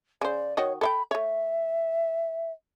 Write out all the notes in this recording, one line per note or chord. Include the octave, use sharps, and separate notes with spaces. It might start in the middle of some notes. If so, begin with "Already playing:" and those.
C#3 C5 D5
D#3 F#4 C#5 D#5
A4 E5 G5 B5
A3 C#5 E5